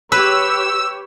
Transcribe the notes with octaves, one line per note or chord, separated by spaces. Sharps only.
G4 B4 C#5 E6